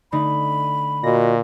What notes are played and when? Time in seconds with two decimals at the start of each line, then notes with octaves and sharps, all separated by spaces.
0.12 D3 A3 D#4 B5
1.04 A#2 F#4 D#5 A#6